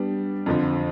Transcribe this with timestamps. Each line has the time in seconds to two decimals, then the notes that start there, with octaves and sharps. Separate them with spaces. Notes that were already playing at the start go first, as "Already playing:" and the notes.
Already playing: G3 B3 D4
0.46 F2 D3 F3